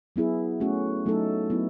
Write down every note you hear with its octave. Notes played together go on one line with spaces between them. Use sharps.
F#3 B3 E4 G#4
A3 C#4 F#4
F#3 A3 D#4 A4
F#3 B3 E4